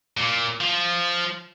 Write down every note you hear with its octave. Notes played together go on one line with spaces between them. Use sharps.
A#2
F3